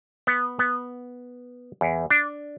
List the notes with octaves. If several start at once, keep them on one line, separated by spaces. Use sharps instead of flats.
B3
B3
E2
D4